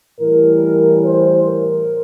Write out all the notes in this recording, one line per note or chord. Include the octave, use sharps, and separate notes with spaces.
A2 E3 G3 A#4
C5
A#4